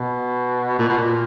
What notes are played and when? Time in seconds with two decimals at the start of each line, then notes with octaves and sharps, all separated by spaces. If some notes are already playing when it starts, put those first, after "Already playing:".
Already playing: B2
0.79 A#2
0.89 B2
0.97 A#2